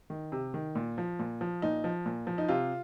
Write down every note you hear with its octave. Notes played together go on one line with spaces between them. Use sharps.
D#3
C3
D#3
A#2
F3
A#2
F3
A#2 D#4
F3
A#2
F3
D#4
C3 F4